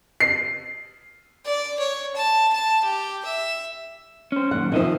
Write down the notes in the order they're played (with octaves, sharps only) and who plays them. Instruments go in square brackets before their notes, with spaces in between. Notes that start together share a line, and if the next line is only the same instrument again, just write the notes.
[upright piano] C7
[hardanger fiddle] D5
C#5
A5
A5
G4
E5
[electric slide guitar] C#4 C5
[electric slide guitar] F#2 A#2 D#3 [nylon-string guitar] F#5
[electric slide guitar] C3 D#5 E5 [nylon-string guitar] D#3 F3